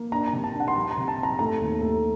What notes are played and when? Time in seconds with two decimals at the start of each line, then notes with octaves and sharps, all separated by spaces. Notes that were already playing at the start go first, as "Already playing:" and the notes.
Already playing: A#3
0.12 D4 A#5
0.27 A#5
0.33 C3
0.44 A5
0.54 D4
0.60 F#5
0.68 C6
0.75 G3 A#5
0.91 A#5
0.97 C3
1.08 A5
1.18 C4 A#5
1.39 A3 A#5
1.60 D#2
1.81 A3